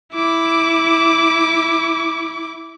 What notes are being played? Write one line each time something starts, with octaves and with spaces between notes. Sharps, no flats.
E4 D6